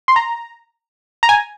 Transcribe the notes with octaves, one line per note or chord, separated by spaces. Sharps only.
C6
A#5
A#5
G#5